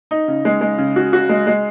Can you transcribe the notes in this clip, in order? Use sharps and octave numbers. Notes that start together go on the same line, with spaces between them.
D#4
C#3
G#3
G#3
C#3
F#4
F#4
G#3
G#3